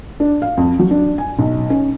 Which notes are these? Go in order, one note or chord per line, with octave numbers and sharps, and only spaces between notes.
D4
F5
F2
F#3
D4
G#5
B1
C#4